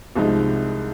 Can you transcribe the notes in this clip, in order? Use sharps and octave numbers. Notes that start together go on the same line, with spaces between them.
C2 C3 F3 G#3 D#4